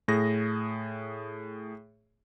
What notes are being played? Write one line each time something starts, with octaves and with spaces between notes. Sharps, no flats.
A2 G#4 A#6